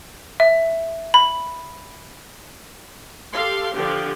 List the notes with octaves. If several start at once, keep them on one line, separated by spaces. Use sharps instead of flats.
E5
B5
G4 A4 F5 C6
D3 F3 G4